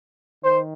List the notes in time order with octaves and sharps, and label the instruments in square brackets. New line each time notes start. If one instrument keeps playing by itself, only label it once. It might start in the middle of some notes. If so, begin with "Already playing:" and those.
[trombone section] D#3 C5